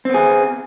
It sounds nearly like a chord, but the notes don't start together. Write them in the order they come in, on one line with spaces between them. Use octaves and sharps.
C4 B3 G#4